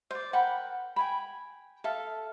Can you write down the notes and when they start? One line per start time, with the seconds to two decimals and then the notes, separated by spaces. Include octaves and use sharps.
0.11 C5 D5
0.33 A#4 F#5 G5 B5
0.96 G5 G#5 B5
1.84 A4 E5 F5